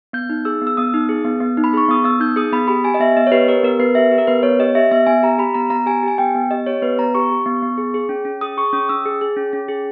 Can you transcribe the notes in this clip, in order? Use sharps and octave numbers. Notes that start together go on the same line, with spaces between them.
B3 G6
D#4
G#4 E6
B3
E6
B3 D#6
D#4
G#4
B3
B3
D#4
B5
G#4 C#6
B3 D#6
B3 E6
D#4 G6
G#4 D#6
B3 B5
G4 B5
G4 G#5
D#5
B3 E5
B3 D#5
C#5
G4 B4
G4 A#4
B3 A#4
B3 B4
G4 E5
G4
A#4
B3 B4
B3 C#5
G4 D#5
G4 E5
B3 E5
B3 G#5
G4 A#5
G4 B5
B3 A#5
B3 A#5
G4 G#5
G4
G#5
B3 G5
B3
G4 D#5
G4 C#5
B3 B4
B3 A#5
G4 C#6
G4
B3
B3
G#4
G#4
C#4
C#4
G#4 D#6
G#4 C#6
C#4 D#6
C#4 E6
G#4
G#4
C#4
C#4
G#4